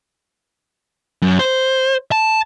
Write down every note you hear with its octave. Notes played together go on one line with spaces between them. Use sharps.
F#2
C5
A5